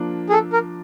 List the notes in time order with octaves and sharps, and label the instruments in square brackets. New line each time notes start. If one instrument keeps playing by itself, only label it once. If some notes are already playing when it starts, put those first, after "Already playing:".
Already playing: [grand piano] F3 A#3 D4
[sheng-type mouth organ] G#4
A4
A#4